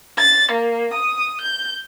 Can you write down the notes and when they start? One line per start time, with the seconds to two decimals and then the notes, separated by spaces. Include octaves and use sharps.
0.18 A6
0.52 A#3
0.94 D#6
1.41 G6